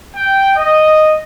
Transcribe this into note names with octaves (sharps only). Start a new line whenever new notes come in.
G5
D#5